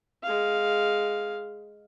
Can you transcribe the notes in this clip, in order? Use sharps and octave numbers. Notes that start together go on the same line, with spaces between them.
G#3 F5